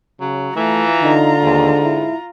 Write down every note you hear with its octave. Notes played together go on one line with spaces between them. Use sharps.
C#3 F#3
E3 A3 F4 A#5
D3 D#4
D#2 G#2
E4